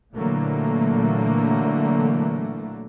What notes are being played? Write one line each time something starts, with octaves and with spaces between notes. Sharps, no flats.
A#2 D3 E3 F#3 A3 A#3